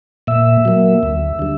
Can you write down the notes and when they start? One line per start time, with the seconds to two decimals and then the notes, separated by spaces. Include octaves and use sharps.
0.27 A#2 E5
0.65 F#3 A#3
1.03 D2
1.39 D3 G3